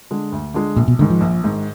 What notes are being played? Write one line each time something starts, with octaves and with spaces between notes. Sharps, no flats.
D3 G#3
D2
D3 G#3
A#1 A#2
B2
G#2 D3 D#3
F3
A#1
G#2 D#3